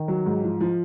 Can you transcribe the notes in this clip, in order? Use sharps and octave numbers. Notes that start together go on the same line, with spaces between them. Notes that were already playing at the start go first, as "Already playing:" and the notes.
Already playing: D#3
F#3
G#2
F3
F3